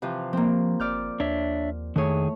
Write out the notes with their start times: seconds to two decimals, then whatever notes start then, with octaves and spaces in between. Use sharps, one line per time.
0.02 C3 E3 F3
0.33 F3 A#3 C4
0.80 G1 D5 F6 G6
1.20 D#2 D4 C#5 E5
1.96 F2 D#3 A3 E4 G#4 C#5